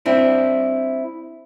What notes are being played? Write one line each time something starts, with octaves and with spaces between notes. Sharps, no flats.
C4 D4 E4